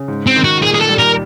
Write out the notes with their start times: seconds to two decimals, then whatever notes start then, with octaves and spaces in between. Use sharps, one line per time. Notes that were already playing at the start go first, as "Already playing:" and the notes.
Already playing: C#3
0.08 G#2
0.27 C4
0.36 D#3
0.44 F#4
0.62 A#2 G#4
0.74 G#4
0.80 A4
0.89 G3
0.98 A#4